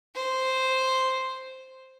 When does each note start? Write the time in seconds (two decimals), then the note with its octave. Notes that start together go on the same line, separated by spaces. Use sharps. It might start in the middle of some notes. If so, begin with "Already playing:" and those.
0.15 C5